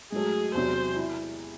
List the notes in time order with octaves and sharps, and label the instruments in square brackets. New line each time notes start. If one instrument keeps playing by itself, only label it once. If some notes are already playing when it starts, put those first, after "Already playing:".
[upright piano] G#2 F#3 A3 [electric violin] G#4
[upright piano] E2 C3 F#3 [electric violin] C5
[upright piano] E4